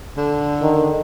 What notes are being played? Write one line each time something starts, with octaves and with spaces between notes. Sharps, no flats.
D3
D#3